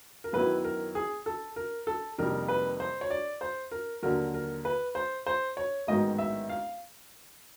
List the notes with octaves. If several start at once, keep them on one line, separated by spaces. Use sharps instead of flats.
A#4
F#2 D#3 F#3 B3 E4 B4
A#4
G#4
A4
A#4
A4
F2 C3 D#3 G3 A#3 A#4
B4
C5
C#5
D5
C5
A#4
D#2 D3 F#3 A#4
A#4
B4
C5
C5
C#5
A1 G#2 D#3 F#3 B3 D#5
E5
F5